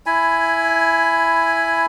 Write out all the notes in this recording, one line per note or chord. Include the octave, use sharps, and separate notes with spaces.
E4 G#5 B5